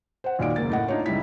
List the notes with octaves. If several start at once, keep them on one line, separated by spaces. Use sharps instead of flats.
C5 F#5
D#2 A#2 F#4 D5 D#5 D7
F#1 A#3 A6
A2 D#5 F#5
D4 D#4 F4 C#5
C#2 G3 D#4 E4 B6